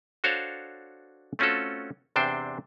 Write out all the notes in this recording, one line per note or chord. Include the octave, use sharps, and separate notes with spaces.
D4 F#4 A4 C5 C#5 F5
A3 C4 C#4 F4 F#4 A4
E2 C3 D4 C5 G5